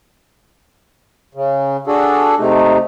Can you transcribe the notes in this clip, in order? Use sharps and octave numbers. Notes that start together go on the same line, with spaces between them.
C#3
D4 F#4 G#4 A4
C3 A3 D#4